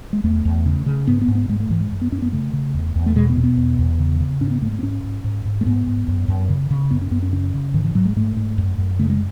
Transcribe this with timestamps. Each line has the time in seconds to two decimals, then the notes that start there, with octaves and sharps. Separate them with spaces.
0.13 G#3
0.24 E2 A3
0.45 E2
0.66 C#3
0.86 C#3
1.07 G#2 B3
1.22 B3
1.28 G#2
1.35 B3
1.49 G#2 G#3
1.60 A3
1.70 G#2 E3
1.81 G#3
1.91 F#2
2.01 B3
2.12 F#2 C#4
2.22 B3
2.32 C#3 A3
2.53 C#3
2.74 E2
2.96 E2
3.06 A3
3.16 B2 G#3
3.29 B3
3.37 B2
3.44 B3
3.57 E2
3.79 E2
3.99 C#3
4.20 C#3
4.41 G#2 C#4
4.51 B3
4.62 G#2 A3
4.72 A3
4.79 B3
4.82 G#2 C#4
5.04 G#2
5.24 G#2
5.45 G#2
5.61 A3
5.66 G#2 B3
5.87 G#2
6.08 F#2
6.28 F#2
6.49 C#3
6.71 C#3
6.91 F#2 B3
7.01 C#4
7.11 F#2 B3
7.22 C#4
7.33 C#3 C#4
7.54 C#3
7.74 G#2 D#3
7.84 E3
7.95 G#2 F#3
8.05 G#3
8.16 G#2 A3
8.37 G#2
8.58 F#2
8.78 F#2
8.99 C#3 A3
9.10 G#3